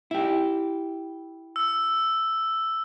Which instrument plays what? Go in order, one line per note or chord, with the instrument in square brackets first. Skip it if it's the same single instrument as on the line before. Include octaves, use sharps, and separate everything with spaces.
[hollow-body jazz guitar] E4 G4
[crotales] E6